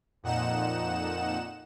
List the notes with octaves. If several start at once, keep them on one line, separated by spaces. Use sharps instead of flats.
F2 A#2 D#4 F#5 E7